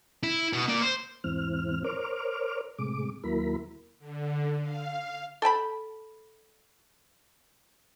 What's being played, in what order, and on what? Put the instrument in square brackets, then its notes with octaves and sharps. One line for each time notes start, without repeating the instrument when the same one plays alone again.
[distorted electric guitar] E4
B2
A#3 D5
C5
[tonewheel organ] E2 G#2 E3 C4 F6
A#4 C5 C#5 D6 F6
A2 C3 G#3 D6
D#2 F#3 A#3 E4 A#4 B5
[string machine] D3
F5
[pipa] A4 G5 A5 B5